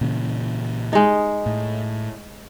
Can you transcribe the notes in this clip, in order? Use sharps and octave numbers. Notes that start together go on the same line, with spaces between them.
A#2 C#3 E3
G#3 D#4
A2